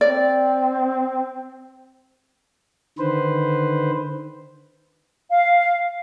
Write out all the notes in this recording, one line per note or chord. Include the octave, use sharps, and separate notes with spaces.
C4 D5
D3 D#3 B4 C5
F5